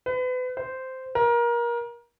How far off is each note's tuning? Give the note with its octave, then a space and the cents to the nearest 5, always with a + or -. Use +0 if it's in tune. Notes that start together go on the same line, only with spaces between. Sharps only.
B4 +35
C5 -10
A#4 +25